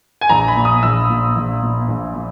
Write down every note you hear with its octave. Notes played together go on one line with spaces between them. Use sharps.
G#5
A#1 A#5
B5
A#2
D#6
A#1 E6
A#2
A#1
A#2
A#1
A#2